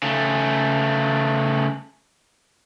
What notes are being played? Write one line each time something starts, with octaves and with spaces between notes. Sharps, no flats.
C#3 A3